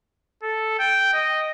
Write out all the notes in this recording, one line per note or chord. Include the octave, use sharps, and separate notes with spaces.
A4
G5
D#5